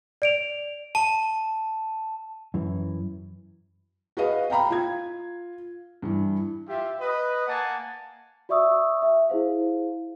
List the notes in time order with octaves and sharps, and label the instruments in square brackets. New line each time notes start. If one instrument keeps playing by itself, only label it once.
[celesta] D5 D7 F7
[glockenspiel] A5 [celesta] D#7
[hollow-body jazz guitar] F#2 E3
[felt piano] F#4 G#4 B4 D#5 F5
F5 G5 A#5 B5
F4 G#6
G2 E3
[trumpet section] F4 G4 E5
B4 D#5
A#3 F#5 G#5 A5
[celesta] F#4 D5 E5 C#6 D#6 E6
E5
E4 G#4 C5 F5